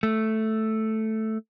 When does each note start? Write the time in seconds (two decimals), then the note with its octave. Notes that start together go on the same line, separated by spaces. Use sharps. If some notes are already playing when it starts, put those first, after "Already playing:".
0.03 A3